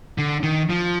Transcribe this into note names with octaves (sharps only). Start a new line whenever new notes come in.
D3
D#3
F3